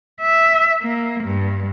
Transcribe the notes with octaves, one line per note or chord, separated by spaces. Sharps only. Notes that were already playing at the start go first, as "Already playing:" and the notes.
E5
A#3
G2